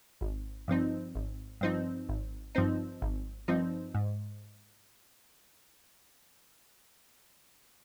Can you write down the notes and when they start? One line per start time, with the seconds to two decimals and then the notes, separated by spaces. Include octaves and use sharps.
0.21 G#1
0.68 G2 F3 C4 D#4
1.15 G#1
1.61 G2 F3 C4 D#4
2.09 G#1
2.55 G2 F3 C4 D#4
3.02 G#1
3.48 G2 F3 C4 D#4
3.95 G#2